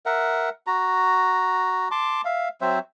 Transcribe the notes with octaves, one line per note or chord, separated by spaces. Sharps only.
A#4 E5 F#5
F#4 A#5
A5 C6 D6
E5 F5
F#3 C4 C5 E5